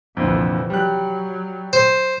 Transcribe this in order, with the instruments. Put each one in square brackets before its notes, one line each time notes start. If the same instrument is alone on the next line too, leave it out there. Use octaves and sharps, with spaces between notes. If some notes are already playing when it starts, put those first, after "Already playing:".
[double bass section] C2 E3 F3 [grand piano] F2 A#2 D3
[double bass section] F#3 [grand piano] G3 F#6
[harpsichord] C5